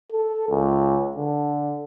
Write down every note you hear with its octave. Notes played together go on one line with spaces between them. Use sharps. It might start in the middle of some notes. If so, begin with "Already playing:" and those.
A4
C#2
D3